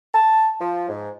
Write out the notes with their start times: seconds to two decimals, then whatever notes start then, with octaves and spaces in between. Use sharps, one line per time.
0.14 A5
0.60 F3
0.89 G#2